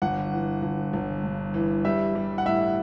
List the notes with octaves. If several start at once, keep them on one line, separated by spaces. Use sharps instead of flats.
G1 F#5
E3
G1
G1
G2
E3
G3 E5
G3
F#5
A2 E5